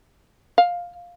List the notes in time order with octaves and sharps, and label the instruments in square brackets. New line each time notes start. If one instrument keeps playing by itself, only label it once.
[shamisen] F5